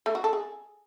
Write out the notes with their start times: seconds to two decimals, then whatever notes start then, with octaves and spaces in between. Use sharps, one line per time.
0.06 A3
0.15 F#4
0.24 A4
0.33 G#4